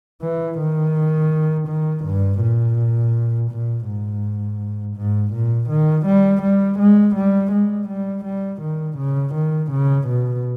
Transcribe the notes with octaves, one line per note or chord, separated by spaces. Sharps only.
E3
D#3
D#3
G2
A#2
A#2
G#2
G#2
A#2
D#3
G3
G3
G#3
G3
G#3
G3
G3
D#3
C#3
D#3
C#3
B2